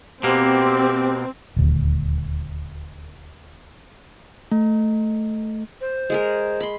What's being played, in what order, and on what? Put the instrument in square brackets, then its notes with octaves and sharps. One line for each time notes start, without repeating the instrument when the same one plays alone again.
[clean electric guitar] B2 A#3 [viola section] C4 [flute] G4
[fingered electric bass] D#1 D2
[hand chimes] A3
[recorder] C5
[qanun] G#3 G#4 A#4
B5 C6